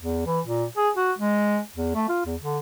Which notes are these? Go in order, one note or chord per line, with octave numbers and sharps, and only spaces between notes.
E2
E3
A#2
G#4
F#4
G#3
E2
A3
F4
E2
D3